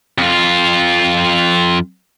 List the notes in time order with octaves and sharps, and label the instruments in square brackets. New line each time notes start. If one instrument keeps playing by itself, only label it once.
[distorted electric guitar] F2 F4